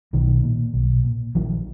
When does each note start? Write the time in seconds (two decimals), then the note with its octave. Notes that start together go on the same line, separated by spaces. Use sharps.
0.13 B1 D#3
0.43 A#2
0.74 B1
1.04 A#2
1.35 A#1 D#3 F3